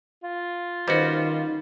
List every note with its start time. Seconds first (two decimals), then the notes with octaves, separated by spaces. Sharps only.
0.23 F4
0.88 D#3 G3 C#4 F#4 B4 C5 D#5